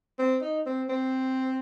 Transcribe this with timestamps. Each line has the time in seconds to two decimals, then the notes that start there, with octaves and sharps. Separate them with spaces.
0.19 C4
0.41 D#4
0.66 C4
0.89 C4